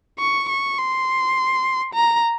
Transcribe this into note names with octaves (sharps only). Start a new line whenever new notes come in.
C#6
C#6
C6
A#5